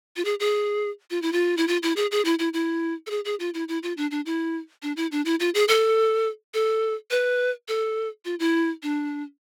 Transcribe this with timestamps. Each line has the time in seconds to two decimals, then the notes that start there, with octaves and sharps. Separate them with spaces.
0.17 F4
0.25 G#4
0.40 G#4
1.10 F4
1.22 E4
1.32 F4
1.57 E4
1.68 F4
1.83 E4
1.96 G#4
2.11 G#4
2.25 E4
2.39 E4
2.53 E4
3.07 A4
3.10 G#4
3.25 G#4
3.40 F4
3.54 E4
3.68 E4
3.83 F4
3.97 D4
4.11 D4
4.26 E4
4.83 D4
4.97 E4
5.12 D4
5.25 E4
5.40 F4
5.55 G#4
5.68 A4
6.54 A4
7.11 B4
7.68 A4
8.25 F4
8.39 E4
8.83 D4